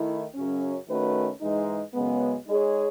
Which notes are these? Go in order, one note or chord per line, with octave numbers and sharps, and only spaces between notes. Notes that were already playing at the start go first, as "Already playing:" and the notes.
Already playing: D#3 A3 E4
F#2 C#3 F#3 C#4
D#3 A3 C#4 F#4 B4
G#2 E3 G#3 D#4
F#2 C#3 G#3 B3
G#3 D#4 G#4 C#5